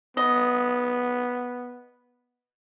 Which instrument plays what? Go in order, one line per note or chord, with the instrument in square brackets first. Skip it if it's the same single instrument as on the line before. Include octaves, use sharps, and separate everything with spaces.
[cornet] B3 [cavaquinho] D#5